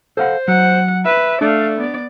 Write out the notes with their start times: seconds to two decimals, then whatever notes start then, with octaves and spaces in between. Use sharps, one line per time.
0.17 A4 C5 F5 F#5
0.48 F#3 F#5
1.05 B4 E5
1.41 A3 D4 D5 F5
1.77 B3 D5